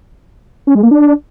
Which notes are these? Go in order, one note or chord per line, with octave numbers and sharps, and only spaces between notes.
C#4
G#3
A#3
D4